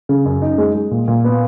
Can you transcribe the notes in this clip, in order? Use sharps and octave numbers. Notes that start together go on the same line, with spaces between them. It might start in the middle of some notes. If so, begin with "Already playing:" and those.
C#3
F#2
D#4
G#3
G#3
A#2
A#2
B3